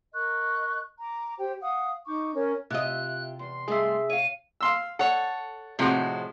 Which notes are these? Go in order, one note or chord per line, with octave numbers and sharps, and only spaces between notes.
A#4 D#5 C#6 F#6
A#5 D6
G4 C5 G5
F5 F#5 D#6
D#4 C#6 D6 G6
C#4 A#4 C#5
C3 E4 F4 G4 D#5 F#6
E2 C6
G2 G#3 A3 G#4 E5
C#5 F5 D#7
F5 C6 E6
A4 C#5 F#5
A2 C3 F3 G#3 F#4